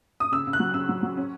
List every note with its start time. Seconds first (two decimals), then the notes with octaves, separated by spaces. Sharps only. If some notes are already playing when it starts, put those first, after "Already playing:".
0.20 D#6
0.32 C#3 E6
0.47 C#3
0.53 F#6
0.60 F#3
0.74 C#3 E6
0.89 F#3
1.03 F#3
1.17 C#4